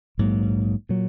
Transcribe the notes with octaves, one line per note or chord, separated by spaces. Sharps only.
A#1 G#2 F#3 A#3
A#2 F#3